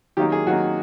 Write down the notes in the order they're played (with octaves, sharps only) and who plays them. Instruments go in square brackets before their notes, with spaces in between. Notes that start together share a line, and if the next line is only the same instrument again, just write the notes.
[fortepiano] D#3 F#3 A#3 D#4 G4
G#4
D#3 F#3 A#3 D#4 F#4